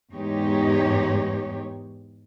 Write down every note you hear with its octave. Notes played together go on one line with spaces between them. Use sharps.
E2 G#2 G#3 D#4 G4 C#5